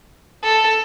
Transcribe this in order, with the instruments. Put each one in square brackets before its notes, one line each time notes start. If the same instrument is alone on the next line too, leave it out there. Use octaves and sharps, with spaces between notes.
[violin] A4